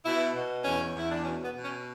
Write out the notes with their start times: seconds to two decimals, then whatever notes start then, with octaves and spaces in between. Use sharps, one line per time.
0.05 B2 E4
0.35 B2
0.65 E2 C#4
0.95 E2 E4
1.11 D4
1.25 B2 C#4
1.44 B3
1.54 B2
1.64 C#4